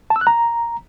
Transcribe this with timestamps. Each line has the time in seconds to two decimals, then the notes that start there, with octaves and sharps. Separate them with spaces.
0.10 A5
0.16 E6
0.21 F#6
0.27 A#5